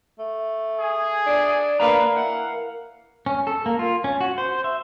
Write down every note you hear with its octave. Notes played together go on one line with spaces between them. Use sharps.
A3
G#4
D4
D4 A#4 B4 F5 A#5
E3 F#5
C#4
A4
A#3
F4
C#4
F#4
C5
E5